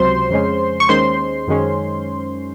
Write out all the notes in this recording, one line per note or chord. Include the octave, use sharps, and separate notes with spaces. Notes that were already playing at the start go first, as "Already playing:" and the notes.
Already playing: C#2 C3 F#3 C5 C6
F2 C#3 G#3 C#4
C#6
D#2 D#3 G#3 C#4 C5 C6
F#2 D#3 G#3 C#4